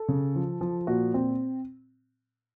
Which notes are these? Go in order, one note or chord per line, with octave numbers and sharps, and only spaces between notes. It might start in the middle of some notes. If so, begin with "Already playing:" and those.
Already playing: A4
C#3
F3
F3
A#2 F#4
C4